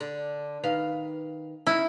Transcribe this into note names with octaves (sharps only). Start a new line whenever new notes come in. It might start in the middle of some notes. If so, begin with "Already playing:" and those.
D3
D#3 B4 F5
C#4 D#4 E4